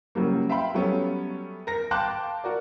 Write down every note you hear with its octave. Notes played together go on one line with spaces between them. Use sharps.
C#3 F#3 G3 A#3
E5 F5 G5 B5 C6
F#3 G3 A3 B3 C#4
A#4 A#6
F5 G5 A5 C6 D6 F#6
F#4 A#4 D5